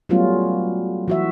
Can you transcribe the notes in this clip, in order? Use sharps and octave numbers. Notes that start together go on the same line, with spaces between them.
F#3 G3 A3 B3 C#4 F4
E3 F#4 E5